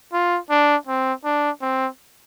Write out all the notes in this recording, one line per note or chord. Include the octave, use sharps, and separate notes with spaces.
F4
D4
C4
D4
C4